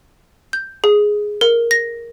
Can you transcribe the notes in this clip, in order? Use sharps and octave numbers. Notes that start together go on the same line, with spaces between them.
G6
G#4
A#4
A#6